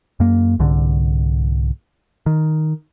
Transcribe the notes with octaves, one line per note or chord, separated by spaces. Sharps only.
F#2 A#3
C2 G#2 D3
D#3